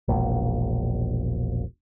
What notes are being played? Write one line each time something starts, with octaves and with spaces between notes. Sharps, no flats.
E1 A#1